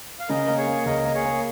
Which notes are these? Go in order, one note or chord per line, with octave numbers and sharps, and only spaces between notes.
F5
C#3 A#4 D#5
A#3 A#4
G#4 C#5
A#3
C#2 A#4 D#5
A#3
G#4 C#5
A#3